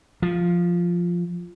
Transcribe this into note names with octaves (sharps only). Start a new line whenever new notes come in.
F3